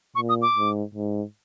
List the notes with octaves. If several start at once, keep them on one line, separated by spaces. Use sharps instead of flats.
A#2 C#6
D#6
D6
G#2
G#2